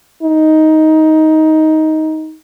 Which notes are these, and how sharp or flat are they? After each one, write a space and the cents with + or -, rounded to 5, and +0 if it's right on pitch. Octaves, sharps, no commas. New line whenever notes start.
D#4 +10